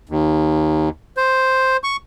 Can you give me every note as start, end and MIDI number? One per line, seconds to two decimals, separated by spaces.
0.09 0.89 39
1.17 1.77 72
1.84 1.96 85